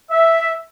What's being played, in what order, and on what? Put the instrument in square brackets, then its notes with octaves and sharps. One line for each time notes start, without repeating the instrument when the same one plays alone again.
[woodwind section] E5